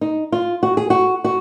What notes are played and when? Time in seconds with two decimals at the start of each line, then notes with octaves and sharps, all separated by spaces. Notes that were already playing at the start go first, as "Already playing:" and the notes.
0.01 D#4
0.32 F4
0.63 F#4
0.77 G#4
0.90 F#4
1.24 F#4